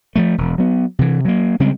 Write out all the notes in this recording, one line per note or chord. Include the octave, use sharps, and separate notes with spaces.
F3 G3 A3
E1
F#3 B3
C3 E3
F#3 A#3
C#3 G3 G#3 C4